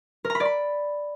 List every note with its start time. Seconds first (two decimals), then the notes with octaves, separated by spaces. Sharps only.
0.25 A#4
0.30 A#5
0.35 B5
0.40 D5
0.45 B5